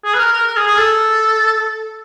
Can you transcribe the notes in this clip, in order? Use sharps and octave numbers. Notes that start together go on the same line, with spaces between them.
G#4
B4
A#4
A#4
A#4
G#4
G#4
A4